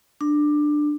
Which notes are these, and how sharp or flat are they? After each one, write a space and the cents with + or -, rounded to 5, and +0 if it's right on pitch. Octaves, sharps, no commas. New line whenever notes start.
D4 +15